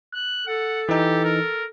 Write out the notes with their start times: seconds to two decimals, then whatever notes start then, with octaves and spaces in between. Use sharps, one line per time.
0.15 F#6
0.47 A4 F#5
0.89 E3 D#4 G4
1.24 A#4